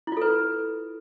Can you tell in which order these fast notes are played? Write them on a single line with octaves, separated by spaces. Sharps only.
E4 F4 A4 B4